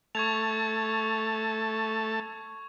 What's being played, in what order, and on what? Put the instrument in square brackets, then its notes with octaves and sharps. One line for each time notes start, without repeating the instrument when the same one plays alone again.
[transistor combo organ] A3 A5 [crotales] C#6 G#6 F7